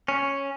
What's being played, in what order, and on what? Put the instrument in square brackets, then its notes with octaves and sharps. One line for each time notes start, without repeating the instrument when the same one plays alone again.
[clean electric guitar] C#4